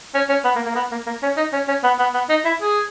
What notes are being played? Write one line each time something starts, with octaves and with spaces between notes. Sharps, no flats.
C#4
C#4
B3
A#3
A#3
B3
A#3
A#3
C#4
D#4
C#4
C#4
B3
B3
B3
D#4
E4
G#4